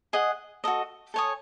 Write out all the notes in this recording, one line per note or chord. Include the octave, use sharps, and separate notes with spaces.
G#4 D#5 F#5
F#4 A4 D#5
A4 C#5 G#5 D#6